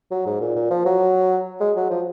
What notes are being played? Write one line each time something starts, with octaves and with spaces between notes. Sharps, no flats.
F#3
G#2
A#2
A#2
F3
F#3
G#3
F#3
F3